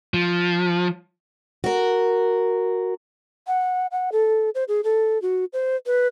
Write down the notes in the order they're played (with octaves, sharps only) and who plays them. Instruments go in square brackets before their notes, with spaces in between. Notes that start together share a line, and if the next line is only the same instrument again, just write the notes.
[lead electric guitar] F3
[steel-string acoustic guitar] F#4 A#4
[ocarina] F#5
F#5
A4
C5
G#4
A4
F#4
C5
B4